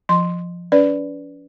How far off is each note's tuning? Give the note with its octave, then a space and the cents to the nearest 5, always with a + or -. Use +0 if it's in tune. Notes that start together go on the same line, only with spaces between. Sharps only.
F3 +0 C6 +0
C#4 +45 B4 +0 D5 -5